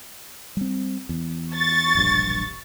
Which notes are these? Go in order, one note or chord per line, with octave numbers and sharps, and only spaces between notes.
G3 C4
E2
C#6 A6
E1 A#1 G2